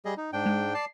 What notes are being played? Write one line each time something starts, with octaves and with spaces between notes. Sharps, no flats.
G3 G#4 D#5
D#4
G#2 D4 G5
G#3
D5 A5 C7